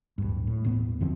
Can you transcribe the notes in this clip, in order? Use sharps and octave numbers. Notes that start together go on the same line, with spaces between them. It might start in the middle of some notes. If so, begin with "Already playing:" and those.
D1 G2
A2
D#1 A2 B3
F#2 D3 F3 C4